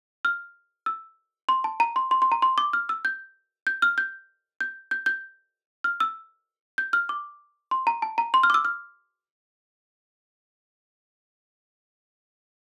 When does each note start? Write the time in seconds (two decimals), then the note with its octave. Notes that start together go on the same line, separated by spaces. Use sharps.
0.25 F6
0.86 E6
1.49 C6
1.64 A5
1.80 A#5
1.96 C6
2.11 C6
2.22 C6
2.32 A#5
2.42 C6
2.58 D6
2.73 F6
2.89 E6
3.05 G6
3.67 G6
3.82 F6
3.98 G6
4.61 G6
4.91 G6
5.06 G6
5.84 F6
6.00 E6
6.78 G6
6.93 F6
7.09 D6
7.71 C6
7.87 A#5
8.02 A5
8.18 A#5
8.34 C6
8.43 F6
8.50 D6
8.54 E6
8.65 F6